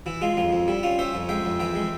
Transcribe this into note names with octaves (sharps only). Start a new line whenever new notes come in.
E3 E4
G#3 F4
F2 F4
F2
G3 E4
C#4 F4
C#4 C5 E5
F2
G#3 E5 G5
F2
E3 E5 G5
G#3